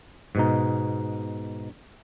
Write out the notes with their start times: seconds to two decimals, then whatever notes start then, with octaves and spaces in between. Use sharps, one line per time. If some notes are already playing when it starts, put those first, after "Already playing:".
0.35 G#2 B2 D#4